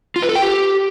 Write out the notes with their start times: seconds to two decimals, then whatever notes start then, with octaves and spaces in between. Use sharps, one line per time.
0.16 F4
0.22 B4
0.29 A4
0.35 G5
0.42 G4